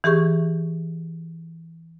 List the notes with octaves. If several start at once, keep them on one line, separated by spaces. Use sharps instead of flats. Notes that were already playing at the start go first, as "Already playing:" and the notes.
E3 G4 G#4 C#6